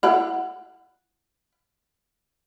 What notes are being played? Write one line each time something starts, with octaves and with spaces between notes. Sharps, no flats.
E4 F#5 B5